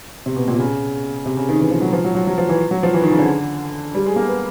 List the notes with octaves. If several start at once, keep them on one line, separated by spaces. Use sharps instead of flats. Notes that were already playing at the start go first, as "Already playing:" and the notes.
C3
B2
A#2
C3
C#3
C3
C#3
D#3
E3
F3
F#3
F3
F#3
F#3
F#3
F3
E3
F#3
F3
E3
D#3
C#3
D3
G3
G#3
A#3
B3